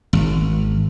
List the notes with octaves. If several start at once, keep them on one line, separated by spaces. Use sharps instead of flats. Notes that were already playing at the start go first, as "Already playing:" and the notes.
G#1